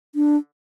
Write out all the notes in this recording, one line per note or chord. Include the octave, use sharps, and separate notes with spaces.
D4